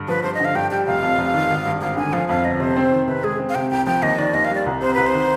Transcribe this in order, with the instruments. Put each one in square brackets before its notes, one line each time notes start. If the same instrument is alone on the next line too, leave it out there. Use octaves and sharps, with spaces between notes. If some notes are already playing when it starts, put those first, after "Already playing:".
Already playing: [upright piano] G2 D3
[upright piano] F3 [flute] B4
[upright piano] G2 [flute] C5
[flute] D#5
[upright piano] D3 [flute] F5
[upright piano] G2 [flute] G5
[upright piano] G3 [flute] G5
[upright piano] F1 [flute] F5
[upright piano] F2
F1
D#3
G#1
G2
[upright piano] G#1 [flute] F5
[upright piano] D3 [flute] G#5
[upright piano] F3 [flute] F5
[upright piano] F2 [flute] F5
[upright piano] G1 [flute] D#5
[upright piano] C3 [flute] C5
[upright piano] C4
D#3
[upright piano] C3 [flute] B4
[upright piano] G#3 [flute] G#4
[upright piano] C4
[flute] F5
[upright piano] C3 [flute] G5
[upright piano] C2 [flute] G5
[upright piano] F3 [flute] G5
[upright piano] D#2 [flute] D#5
[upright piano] D#3 [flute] D5
[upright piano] D#2 [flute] D#5
[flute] F5
[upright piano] G3 [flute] D5
[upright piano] C2
[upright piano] C3 [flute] C5
[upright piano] C2 [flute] B4
[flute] C5
[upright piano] D#3